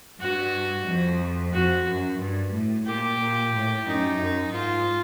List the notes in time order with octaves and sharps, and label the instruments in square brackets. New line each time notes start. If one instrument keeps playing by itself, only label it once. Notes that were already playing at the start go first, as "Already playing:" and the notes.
[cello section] G2 [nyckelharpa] F#4
[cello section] F2
[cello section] F2 [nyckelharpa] F#4
[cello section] F#2
G2
A2
[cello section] A#2 [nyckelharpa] G4
[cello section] A#2
A2
[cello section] F#2 [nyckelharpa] D#4
[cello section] F#2
[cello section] G#2 [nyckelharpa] F4